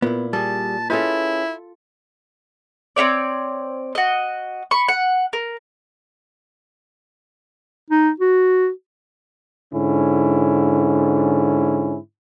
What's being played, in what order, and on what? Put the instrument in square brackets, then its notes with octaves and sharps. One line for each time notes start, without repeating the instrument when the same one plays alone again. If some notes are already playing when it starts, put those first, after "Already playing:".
[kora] A#2 E4 [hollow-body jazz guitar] B3
[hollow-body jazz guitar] G3 G#4 [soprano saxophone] A5
[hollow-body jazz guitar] C#4 G#4 B4 [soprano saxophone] E4 [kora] F4 A4
[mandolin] C4 E4 C#5 D5
F#4 D#5
B5 C#6
F#5
A#4
[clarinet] D#4
F#4
[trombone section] G#2 D3 C#4 E4